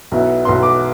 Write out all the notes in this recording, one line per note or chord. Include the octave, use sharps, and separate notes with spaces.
B1 B2 B3 E4
B1 B2 B3 E4 C6
D6